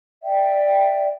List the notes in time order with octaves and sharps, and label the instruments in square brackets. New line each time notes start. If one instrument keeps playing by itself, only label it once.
[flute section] D5 E5 G5